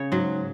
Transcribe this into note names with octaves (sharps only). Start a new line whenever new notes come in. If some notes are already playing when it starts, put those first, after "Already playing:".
Already playing: C#3 C#5
G#2 F#3